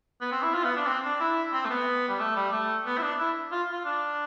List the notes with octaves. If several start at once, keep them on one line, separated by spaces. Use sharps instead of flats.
B3
C4
E4
F4
B3
D4
C4
D4
E4
C4
A3
B3
G3
A3
G3
A3
B3
E4
D4
E4
F4
F4
D4